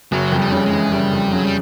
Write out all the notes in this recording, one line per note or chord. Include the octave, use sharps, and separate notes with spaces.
F#1 F#3
F2
G3
C#3
G#3
E3
F#1 G3
F2
C#3 F#3
G3